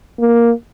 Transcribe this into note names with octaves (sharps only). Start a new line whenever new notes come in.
A#3